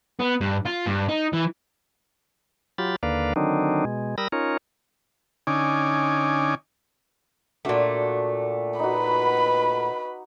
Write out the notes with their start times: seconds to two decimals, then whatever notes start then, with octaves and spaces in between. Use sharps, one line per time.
0.20 B3
0.41 G2
0.66 F4
0.86 G2
1.09 D#4
1.33 E3
2.78 F#3 F4 G4 B5 A6
3.03 D#2 D3 A#3 B4 D5 F5
3.36 D3 D#3 F#3 C4 D4 D#4
3.85 B2 G#3
4.18 G3 A#4 B5 D#6 E6 A#6
4.32 C#4 D#4 F4 A#4 C#5
5.47 D3 C#4 D#4 G#5 D6
7.65 A#2 A3 D4 F#4 F5
8.79 D#4 F#4 B4 B5